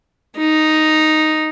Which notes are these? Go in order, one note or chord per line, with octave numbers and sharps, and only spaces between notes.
D#4